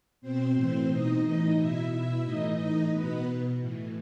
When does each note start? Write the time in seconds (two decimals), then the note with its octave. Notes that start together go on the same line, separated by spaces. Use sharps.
0.21 B2 C4 C5
0.55 A2 E3 C4 C5
0.89 B2 D#4 D#5
1.23 A2 E3 D#4 D#5
1.57 B2 E4 E5
1.91 B2 E4 E5
2.24 A2 E3 D#4 D#5
2.58 A2 E3 D#4 D#5
2.92 B2 B3 B4
3.26 B2
3.60 A2 E3